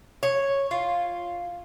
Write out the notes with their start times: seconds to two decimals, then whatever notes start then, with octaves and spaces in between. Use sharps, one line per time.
0.23 C#5
0.71 F4